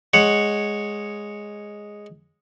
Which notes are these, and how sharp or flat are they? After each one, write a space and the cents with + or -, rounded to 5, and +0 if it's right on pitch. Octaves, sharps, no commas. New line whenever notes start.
G#3 +0 C#5 +0 F#5 +0